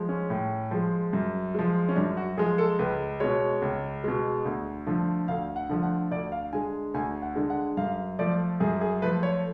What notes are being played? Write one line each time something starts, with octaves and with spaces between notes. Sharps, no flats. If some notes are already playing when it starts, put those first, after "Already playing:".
Already playing: F3 G#3
C#4
A2
F3 G#3
F#2
F3 G#3
C#4
F#2 D4
F#4
F3 G#3 G#4
A4
C#2 B4
B2 G#3 C#5
C#2
B2 G#3
D2
D3 F3 A3
D2 F5
F#5
D3 F3 A3
F#5
D2 D5
F5
D3 G#3 G#5
D2 G#5
F#5
D3 G#3
F#5
F#2 F5
F3 A3 D5
F#2 G#4
G#4
F3 A3 B4
C#5